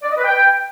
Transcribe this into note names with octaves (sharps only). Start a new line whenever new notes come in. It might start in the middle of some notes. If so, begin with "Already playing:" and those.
D5
D#5
B4
G5